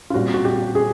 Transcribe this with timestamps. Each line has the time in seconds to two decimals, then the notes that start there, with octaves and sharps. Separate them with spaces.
0.10 F4
0.14 A#2 G3 C4 F#4
0.34 F#4
0.45 G4
0.75 G#4